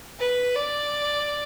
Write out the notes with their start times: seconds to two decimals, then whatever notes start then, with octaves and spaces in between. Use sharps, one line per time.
0.19 B4
0.55 D5